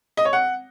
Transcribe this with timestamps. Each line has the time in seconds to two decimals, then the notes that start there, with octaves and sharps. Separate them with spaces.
0.17 D#5
0.25 C#5
0.33 F#5